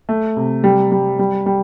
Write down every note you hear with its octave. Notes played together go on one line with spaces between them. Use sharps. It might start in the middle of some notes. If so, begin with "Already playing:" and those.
A3
C3
G3
G3
G3
G3